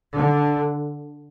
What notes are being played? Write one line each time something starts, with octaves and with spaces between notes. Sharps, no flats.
D3